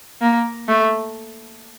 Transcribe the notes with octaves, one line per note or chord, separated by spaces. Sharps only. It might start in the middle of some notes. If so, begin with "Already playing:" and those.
A#3
A3